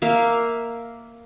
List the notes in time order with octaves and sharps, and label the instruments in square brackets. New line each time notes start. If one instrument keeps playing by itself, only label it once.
[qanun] A#3 E5 F5